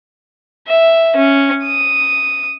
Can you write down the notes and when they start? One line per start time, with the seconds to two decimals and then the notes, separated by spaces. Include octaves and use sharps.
0.68 E5
1.16 C#4
1.64 D#6